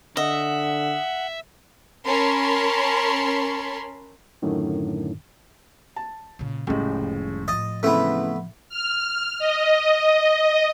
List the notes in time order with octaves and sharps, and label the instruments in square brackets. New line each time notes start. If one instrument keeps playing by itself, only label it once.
[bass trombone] D3 [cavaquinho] D#5 [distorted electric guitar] E5 [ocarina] F#5
[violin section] C#4 A#4 C#5 A5 B5 C6
[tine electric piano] F#2 A2 D3 D#3
[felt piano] A5
[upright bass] A#2 C#3
[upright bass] F1 G3 [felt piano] A2 C#3 G#3
[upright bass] A2 F3 [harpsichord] D#5 [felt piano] A6
[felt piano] C#3 E3 C4 [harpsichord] A3 B3
[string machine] F6
D#5